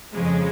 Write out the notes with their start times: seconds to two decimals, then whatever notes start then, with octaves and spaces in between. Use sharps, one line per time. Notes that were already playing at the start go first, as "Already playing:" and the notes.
0.13 F2 C#3 F3 G#3